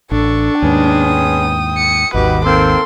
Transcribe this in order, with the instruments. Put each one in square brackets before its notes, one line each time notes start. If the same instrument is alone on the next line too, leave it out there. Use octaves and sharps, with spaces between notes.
[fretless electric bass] A1 [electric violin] D4 [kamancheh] A4 C#6
[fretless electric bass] D#2 G#2 [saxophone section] G#3 B3 C#4 [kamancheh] G5 D#6
[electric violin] C#7
[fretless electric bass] G#1 D#2 [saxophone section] G3 B3 D#4 [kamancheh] F#4 D6 [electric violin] B4
[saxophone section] D#3 A#3 C4 [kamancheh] A4 [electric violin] C6